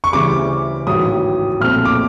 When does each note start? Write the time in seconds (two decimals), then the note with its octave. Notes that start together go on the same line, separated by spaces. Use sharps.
0.04 C#6
0.12 D2 C#3 E3 G3 D6
0.87 A1 G#2 D#3 F#3 D#6
1.60 B1 A#2 F3 A3 C4 F6
1.85 D6